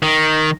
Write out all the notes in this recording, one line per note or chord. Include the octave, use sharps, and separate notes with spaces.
D#3